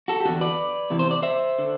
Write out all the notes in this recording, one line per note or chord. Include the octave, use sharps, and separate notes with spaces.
F#4 A4
G4
E2 D3 F#4 A4
B4 D5
E2 C3 E3
C5
D5
C5 E5
D3